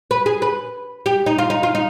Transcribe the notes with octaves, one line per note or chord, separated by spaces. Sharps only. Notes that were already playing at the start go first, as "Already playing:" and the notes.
B4
G#4
B4
G4
D#4
F4
D#4
F4
D#4